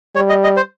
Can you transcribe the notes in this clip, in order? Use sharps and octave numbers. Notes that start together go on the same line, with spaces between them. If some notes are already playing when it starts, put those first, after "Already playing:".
G3 C#5
D#5
D#5
C5